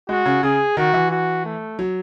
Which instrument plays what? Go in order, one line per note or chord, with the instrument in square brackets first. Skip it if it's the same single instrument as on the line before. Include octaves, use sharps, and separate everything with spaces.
[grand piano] G#3 [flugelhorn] F#4
[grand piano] C#3
[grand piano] C#3 [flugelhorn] G#4
[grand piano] D#3 [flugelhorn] F#4
[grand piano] E3
[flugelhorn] F#4
A3
[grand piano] F#3